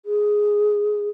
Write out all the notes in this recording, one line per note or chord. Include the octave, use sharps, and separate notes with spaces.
G#4